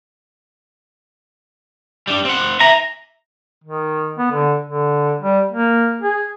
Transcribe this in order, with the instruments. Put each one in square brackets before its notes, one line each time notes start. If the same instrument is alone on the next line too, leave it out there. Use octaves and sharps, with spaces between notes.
[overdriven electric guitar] G3 D4
C4 F#5
[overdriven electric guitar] E5 G#5 [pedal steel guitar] A#5
[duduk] D#3
B3
D3
D3
G3
A#3
G#4